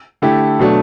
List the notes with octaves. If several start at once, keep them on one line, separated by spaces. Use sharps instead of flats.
D3 A3 E4 G4
B2 F#3 A3 D4